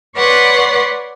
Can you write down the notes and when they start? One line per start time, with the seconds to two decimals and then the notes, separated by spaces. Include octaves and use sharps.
0.15 B4 C#5 D5 F#5 C6